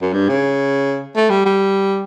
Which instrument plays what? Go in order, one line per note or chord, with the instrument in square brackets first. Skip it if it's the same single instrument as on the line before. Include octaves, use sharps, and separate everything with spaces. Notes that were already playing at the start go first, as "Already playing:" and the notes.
[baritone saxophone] F#2
G2
C#3
A3
G3
G3